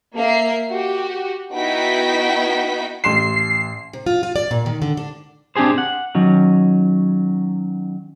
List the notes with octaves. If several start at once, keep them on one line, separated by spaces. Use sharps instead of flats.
A#3 E5 C7
F#4 G4
B3 D#4 E4 F#4 G5 B6
A1 C6 C7 E7
C3
F4
F4
D5
A#2
D#3
D3
D4
C4 D4 G4 G#4 C5
F#5
D#3 F#3 C#4